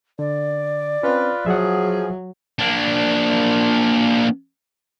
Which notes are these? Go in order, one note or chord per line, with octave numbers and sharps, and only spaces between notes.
D3 D5
C4 C#4 F4 B4
F3 F#3 G#4 E5 F#5
A#3 D4